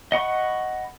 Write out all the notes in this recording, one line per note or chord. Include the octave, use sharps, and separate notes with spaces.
D#5 F#5 B5 C#6